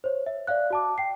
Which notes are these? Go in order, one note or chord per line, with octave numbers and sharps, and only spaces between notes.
C5 C#5
E5
D5 E5 F5 F#6
F#4 A5 D6
G5 C7